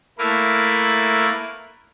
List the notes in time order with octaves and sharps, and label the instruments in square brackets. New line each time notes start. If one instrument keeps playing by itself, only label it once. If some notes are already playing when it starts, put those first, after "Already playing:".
[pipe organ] A3 A#3 E4 A#4 B4